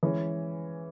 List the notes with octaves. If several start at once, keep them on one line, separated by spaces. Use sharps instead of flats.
E3 G#3 C#4